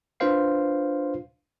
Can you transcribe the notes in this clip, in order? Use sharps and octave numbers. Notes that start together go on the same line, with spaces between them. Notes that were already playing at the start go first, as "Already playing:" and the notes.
D4 F4 B4 C5 F5 C7